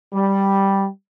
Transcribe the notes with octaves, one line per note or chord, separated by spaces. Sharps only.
G3